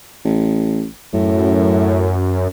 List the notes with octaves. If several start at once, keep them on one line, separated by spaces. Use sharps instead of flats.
A1
F#2 A2